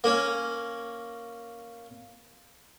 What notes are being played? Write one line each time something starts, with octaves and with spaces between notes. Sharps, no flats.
A#3 C#4